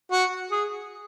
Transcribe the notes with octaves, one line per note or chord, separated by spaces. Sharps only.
F#4
G#4